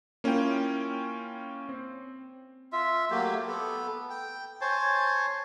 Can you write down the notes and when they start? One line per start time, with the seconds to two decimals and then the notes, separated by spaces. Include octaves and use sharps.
0.24 A#3 C#4 E4 F4 G5
1.69 C4
2.73 F4 E5
3.11 F#3 A3 A#3 G4
3.47 B3 A4
4.10 G5
4.61 C5 C#5 G#5 A5